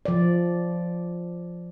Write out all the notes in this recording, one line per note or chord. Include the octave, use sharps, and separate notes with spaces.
F3 D5